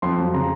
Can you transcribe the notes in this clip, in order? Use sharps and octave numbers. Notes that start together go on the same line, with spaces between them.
F2 C6
F#3
C#3 A#5